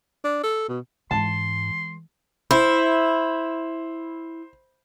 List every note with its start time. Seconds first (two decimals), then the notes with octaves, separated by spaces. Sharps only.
0.24 D4
0.43 A4
0.69 B2
1.11 G#2 E3 G#3 A5 C6
2.51 E4 C5